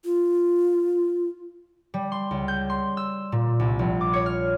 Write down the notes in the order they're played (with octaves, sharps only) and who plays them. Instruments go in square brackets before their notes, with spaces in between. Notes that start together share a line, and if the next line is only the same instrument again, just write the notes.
[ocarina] F4
[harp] G3
C6
C#2
G6
C6
E6
A#2
C2
A#1
D6
C#5
F6